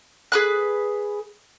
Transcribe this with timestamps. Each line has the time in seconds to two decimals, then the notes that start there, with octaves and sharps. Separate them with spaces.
0.32 G#4 B4 F#6